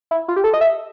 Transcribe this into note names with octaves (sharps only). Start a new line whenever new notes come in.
E4
F4
G4
A4
D#5
E5